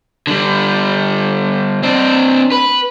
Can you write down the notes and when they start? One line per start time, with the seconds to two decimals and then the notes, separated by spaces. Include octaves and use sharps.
0.27 D3 G3
1.83 C4 D4
2.52 B4